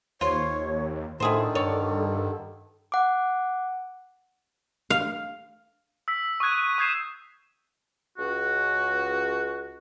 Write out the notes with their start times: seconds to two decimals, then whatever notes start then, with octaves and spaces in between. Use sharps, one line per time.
0.21 D#2 F4 C5 C#5
1.20 A2 D3 D#3 E4 G#4 A4 C5
1.55 G2 C#5 D5
2.92 F#5 D6
4.90 F5
6.08 E6 B6
6.40 C#6 D#6 E6 F#6 G#6 D#7
6.78 C#6 D#6 G6 G#6 C7 E7
8.18 C#2 F#4